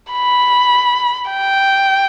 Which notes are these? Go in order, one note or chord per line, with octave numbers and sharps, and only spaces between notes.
B5
G5